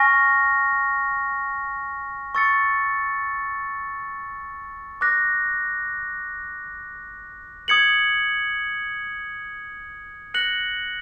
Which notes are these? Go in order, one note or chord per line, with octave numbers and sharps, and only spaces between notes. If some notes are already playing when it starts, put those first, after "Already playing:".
Already playing: G#5 C#6 F6 A#6
C#6 E6 A6 C#7
D6 F#6 A#6
D#6 G#6 C#7 F#7
F#6 A#6 C#7 F#7